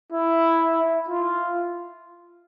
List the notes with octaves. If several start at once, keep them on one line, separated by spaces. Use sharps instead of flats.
E4
F4